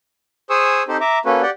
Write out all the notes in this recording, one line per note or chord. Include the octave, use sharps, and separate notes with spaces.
G#4 C5 G#5 C#6 D#6 E6
C4 D#4 G4 A4 C5
E5 A#5 D6
A#3 C#4 F#4 A4 B4
G4 D5 F#5 G5